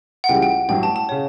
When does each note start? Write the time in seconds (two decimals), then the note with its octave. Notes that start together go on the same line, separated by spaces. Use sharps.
0.24 F#5
0.29 C#2 C#3 E3 G3 G5
0.42 G5
0.69 A1 G2 F#3 G5
0.83 A5
0.96 A5
1.09 C#3 C#5